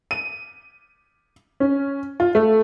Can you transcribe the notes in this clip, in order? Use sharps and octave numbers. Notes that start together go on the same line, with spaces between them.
D#7
C#4
F4
A3